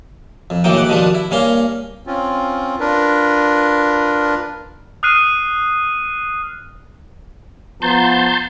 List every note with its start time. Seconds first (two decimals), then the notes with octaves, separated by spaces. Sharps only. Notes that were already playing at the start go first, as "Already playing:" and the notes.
0.50 F2
0.64 A2 D#3 E3 F#3 A#3 G5
0.77 G#2 F#5 D6
0.89 B2 D#3 F3 G3 D4
1.14 E4
1.31 G2 A#3 C#4 F5 C6
2.07 C4 C#4 F4
2.80 D4 F4 A#4 B4
5.03 D#6 F6 F#6 C7 D#7
7.82 F3 B3 A5 A#5 C6 G6